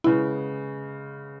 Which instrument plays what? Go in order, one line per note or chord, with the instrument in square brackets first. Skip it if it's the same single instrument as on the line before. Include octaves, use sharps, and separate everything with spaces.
[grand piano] C#3 G#3 B3 [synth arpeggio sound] E4